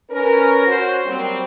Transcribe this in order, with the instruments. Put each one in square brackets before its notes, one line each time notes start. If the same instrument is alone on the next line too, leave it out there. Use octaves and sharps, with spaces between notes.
[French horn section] C#4 A#4 B4
F#4 C5 C#5
F#3 G3 A#3 C4